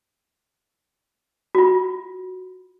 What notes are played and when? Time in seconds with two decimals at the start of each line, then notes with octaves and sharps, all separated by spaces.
1.55 F4 F#4